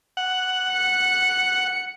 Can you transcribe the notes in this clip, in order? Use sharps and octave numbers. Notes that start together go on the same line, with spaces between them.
F#5
C#7